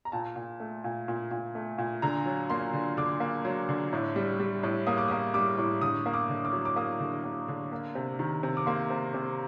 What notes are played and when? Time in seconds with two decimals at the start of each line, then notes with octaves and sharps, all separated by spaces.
0.05 A#5
0.12 A#2 A5
0.36 A#2
0.60 A3
0.84 A#2
1.08 A#2
1.31 A#2
1.55 A3
1.78 A#2
2.02 D3 A#5
2.26 F#3
2.50 A#3 C6
2.73 D3
2.97 D3 D6
3.20 A#3
3.45 F#3
3.69 D3
3.93 A2
4.16 G3
4.40 G3
4.63 A2
4.87 A#3 D#6
4.98 D6
5.08 A#3 D#6
5.34 G3 D6
5.58 A2
5.81 D3 D#6
6.06 A#3
6.13 D6
6.29 D3
6.45 D6
6.52 F#3
6.65 D6
6.76 A#3 D#6
7.00 D3
7.24 A#3
7.48 D3
7.72 A#3
7.95 C3
8.19 D#3
8.43 C3
8.57 D6
8.66 A#3 C6
8.90 C3
9.14 C3